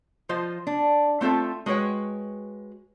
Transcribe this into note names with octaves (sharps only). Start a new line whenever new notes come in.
F3 F4 C5 D#5
D4
A3 C4 F4 A4 E5
G#3 F#4 B4 C#5 G5